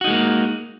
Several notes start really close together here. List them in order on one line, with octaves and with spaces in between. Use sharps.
F#4 D#4 G#3 A#3